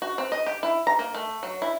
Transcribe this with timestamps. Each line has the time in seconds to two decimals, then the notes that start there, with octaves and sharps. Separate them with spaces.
0.02 F#4
0.18 C4
0.32 D#5
0.46 G4
0.63 E4
0.87 A#5
0.99 A#3
1.15 A3
1.43 F#3
1.62 E4